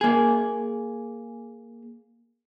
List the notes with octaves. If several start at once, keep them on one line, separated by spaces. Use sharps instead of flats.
A#3 G#4